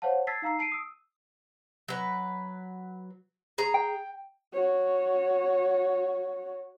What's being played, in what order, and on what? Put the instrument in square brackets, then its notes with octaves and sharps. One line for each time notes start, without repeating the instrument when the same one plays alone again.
[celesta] C5 C#5 F5 F#5 A5
A5 E6 G#6 A6 B6 C7
D#4 F5 A#5 E6 C7
A5 C7 D7 D#7
D#6 E6
[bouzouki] F#3 B4
G#4 A#5
[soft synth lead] G5
[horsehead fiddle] F#4 C#5